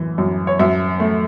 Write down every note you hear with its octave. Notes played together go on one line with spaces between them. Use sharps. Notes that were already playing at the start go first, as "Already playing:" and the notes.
Already playing: F#2 E3
F#2
C#5
F#2 E5
A3